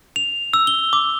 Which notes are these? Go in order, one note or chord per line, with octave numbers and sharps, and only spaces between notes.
F7
E6
G7
D6